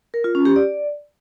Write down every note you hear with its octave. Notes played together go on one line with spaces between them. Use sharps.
A#4
F4
C#4
G4
D5